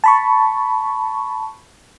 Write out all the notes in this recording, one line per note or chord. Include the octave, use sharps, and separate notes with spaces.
A5 B5 C#6